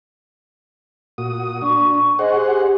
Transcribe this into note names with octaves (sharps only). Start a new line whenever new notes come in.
A#2 F#4 D#6
D4 C#6
G#4 C5 D#5 F#5
G4